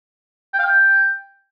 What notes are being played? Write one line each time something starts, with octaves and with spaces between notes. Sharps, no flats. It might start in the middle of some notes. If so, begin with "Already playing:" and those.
G5
F5
G5